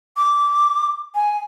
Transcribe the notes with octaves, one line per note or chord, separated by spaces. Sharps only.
D6
G#5